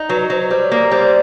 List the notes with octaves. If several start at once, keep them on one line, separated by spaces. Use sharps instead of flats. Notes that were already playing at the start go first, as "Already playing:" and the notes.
Already playing: D#4
F#3 B4
F#3 C5
G3 C5
C#5
A#3
G3 C5